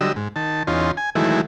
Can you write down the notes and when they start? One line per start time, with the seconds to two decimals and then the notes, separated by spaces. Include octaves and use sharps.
0.01 D3 F#3 G3 D#5 E6
0.16 G#2
0.36 D#3 A5
0.67 E2 C#4 D#4 F4 C6
0.97 G#5
1.15 D#3 E3 F#3 G#3 A3 E4